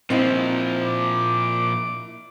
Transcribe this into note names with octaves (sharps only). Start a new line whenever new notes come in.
A#2 F3 C4 D#4 E4
D6